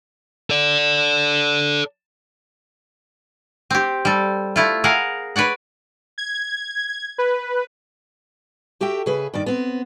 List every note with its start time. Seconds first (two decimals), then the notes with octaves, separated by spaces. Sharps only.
0.50 A4 D5
3.70 C4 G4
4.05 G3 A4
4.56 A3 E4 F4
4.84 G#4 A#4 F5 F#5
5.36 B4 C#5 D5 F#5
6.18 G#6
7.18 B4
8.81 F#4 G4 A4 E5 G5
9.06 C#3 G#4 B4 E5
9.34 G2 D#3 D5
9.46 B3 C4